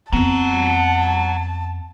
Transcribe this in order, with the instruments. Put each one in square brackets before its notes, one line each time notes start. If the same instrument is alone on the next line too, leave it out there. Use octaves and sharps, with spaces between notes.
[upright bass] F2 B3 [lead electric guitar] F#5 A#5 [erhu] A5